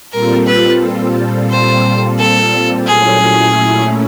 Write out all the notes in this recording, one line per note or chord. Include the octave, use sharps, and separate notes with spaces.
A#2 G3 C4 F4 A4 A#4
B4
C5
A4
A#2 F#3 A3 C#4 E4 G#4